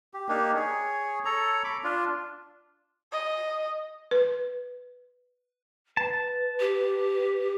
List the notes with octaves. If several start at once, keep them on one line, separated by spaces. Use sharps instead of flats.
G4
A#3 D4 D#4 G4
G#4 C#5
A4 C#5 A#5
B5 D6
D4 F4
D#5
B4
B4 A5
G4